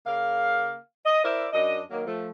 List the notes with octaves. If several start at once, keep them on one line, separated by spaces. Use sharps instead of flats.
C#3 A#3 F5
D#5
E4 A#4 C5 D5 E5
F#2 D4 D#5
D#3 F#3 A#3
F3 A3